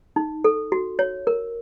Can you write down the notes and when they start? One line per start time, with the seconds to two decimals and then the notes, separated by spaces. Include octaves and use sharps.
0.16 D#4
0.44 A4
0.72 F#4
0.99 C#5
1.27 A#4